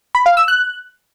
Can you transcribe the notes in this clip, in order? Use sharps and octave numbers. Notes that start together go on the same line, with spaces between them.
B5
F5
E6
F#6